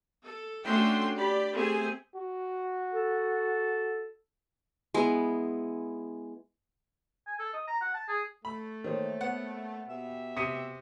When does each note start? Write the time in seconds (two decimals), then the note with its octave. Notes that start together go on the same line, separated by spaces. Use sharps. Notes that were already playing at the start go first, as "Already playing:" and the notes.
0.23 A4
0.65 A3 C#4 D4 F#4 G5 C6
1.15 G4 D5 B5
1.53 A3 C4 G4 G#4 G#5
2.15 F#4
2.93 A4
4.94 G#3 B3 E4
7.27 G#5
7.39 A4
7.54 D#5
7.68 A#5
7.81 F#5
7.94 A5
8.08 G#4
8.45 A3 B5
8.84 D#3 A#3 C5 C#5
9.21 B3 F#5
9.88 B2 G4 E5
10.37 C3 D#6 B6 C#7 D#7